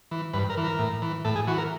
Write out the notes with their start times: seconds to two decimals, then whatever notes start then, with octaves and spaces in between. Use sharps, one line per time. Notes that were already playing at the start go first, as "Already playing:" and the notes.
0.11 E3
0.33 G2 B4
0.50 A#4
0.57 E3
0.64 A#4
0.79 A2
1.02 E3
1.25 A2 A4
1.36 G#4
1.47 E3 F#4
1.58 A#4